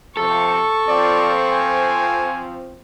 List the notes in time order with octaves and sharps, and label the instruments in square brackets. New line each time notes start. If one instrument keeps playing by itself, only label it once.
[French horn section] C3 F3 [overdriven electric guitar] A4 [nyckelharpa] C#6
[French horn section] F3 C4 [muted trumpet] D5
[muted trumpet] G#5